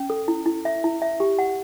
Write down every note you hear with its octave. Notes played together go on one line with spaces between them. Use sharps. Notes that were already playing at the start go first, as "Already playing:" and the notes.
Already playing: C#4
A4
E4
E4
E5
E4
E5
G4
F#5